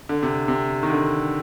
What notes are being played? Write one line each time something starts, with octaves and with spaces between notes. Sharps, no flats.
D3
C3
C3
D#3
D3